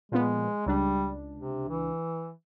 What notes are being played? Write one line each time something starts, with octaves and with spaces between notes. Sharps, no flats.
A#2 F3 G#3 B3
C#2 G3 D4
C3
E3